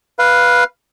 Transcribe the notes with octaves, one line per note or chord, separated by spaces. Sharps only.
B4 F5